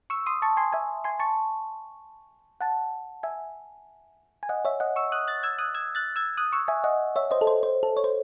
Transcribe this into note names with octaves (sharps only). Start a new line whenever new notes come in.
C#6 E6
C6 D#6
A5 C#6
G#5 C6
E5 G#5
G#5 C6
A5 C#6
F#5 A5
E5 G#5
G#5
D#5 F#5
C#5 E5
D#5 F#5
C#6 E6
D#6 F#6
F#6 A6
E6 G#6
D#6 F#6
E6 G#6
F#6 A6
E6 G#6
D#6 F#6
C#6 E6
E5 G#5
D#5 F#5
C#5 E5
C5 D#5
A4
C5
C5
A4
C#5
C5